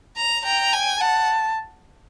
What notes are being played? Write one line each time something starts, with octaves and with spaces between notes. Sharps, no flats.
A#5
G5 A#5
G#5
F#5 A5